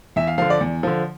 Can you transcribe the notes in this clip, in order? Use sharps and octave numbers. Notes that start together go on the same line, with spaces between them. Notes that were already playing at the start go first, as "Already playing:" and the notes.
E2 E5
F5
D3 F3 F5
D5
E2
D3 F3